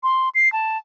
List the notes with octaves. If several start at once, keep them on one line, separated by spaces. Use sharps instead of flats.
C6
C7
A5